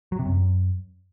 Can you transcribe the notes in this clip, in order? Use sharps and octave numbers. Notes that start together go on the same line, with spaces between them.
F#3
C3
F#2